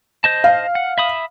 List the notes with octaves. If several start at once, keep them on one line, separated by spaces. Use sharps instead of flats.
C5 D#5 A5
F5
F#5
E5 B5 D#6